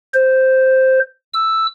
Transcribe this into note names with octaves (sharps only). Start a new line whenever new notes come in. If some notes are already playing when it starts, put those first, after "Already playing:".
C5
E6